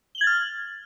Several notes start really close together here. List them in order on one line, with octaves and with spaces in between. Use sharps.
G7 F#7 G#6 A6 F6